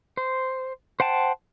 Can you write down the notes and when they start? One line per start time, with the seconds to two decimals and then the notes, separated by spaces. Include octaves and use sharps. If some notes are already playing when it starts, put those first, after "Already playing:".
0.17 C5
1.00 C5 F#5 G5 A5